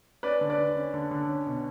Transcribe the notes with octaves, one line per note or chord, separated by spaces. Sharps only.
C#4 B4 D5
D3
B4 D5
D3
C#4
D3
D3
C#4
B2